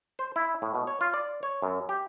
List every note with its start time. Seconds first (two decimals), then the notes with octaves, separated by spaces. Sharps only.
0.19 C5
0.36 E4
0.62 A2
0.75 B2
0.87 C#5
1.01 F4
1.14 D5
1.43 C#5
1.62 F#2
1.89 G4